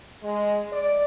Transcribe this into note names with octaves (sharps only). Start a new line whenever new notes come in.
G#3
D5